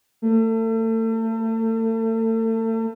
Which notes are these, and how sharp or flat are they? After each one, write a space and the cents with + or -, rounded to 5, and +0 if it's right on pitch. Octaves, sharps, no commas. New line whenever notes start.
A3 +35